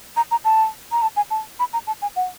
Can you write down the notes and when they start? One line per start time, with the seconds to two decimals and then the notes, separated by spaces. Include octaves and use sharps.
0.17 A#5
0.31 A#5
0.45 A5
0.92 A#5
1.02 A5
1.16 G#5
1.31 A5
1.60 B5
1.73 A#5
1.87 A5
2.02 G#5
2.16 F#5